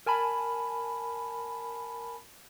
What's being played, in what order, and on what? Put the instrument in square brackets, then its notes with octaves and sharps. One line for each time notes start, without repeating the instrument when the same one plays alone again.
[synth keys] A#4 G#5 A5 B5